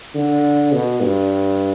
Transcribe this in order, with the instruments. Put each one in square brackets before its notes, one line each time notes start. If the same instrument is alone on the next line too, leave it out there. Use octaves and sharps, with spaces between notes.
[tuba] D3
B2
G2